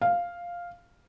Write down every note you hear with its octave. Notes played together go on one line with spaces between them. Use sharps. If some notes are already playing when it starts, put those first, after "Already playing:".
F5